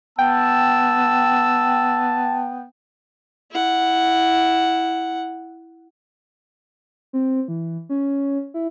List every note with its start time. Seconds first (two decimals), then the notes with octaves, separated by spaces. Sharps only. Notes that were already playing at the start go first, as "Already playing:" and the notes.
0.19 B3 G5 A5 E6
3.51 E4 F#5
7.13 C4
7.48 E3
7.89 C#4
8.54 E4